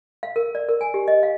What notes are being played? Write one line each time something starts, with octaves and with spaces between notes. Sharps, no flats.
F5
A#4
D5
A#4
G#5
G4
D#5
F5